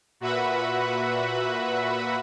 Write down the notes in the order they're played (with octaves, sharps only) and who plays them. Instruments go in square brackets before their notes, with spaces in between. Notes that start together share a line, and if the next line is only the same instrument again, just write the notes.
[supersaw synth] A#2 F#4 B4 E5 F#5 B5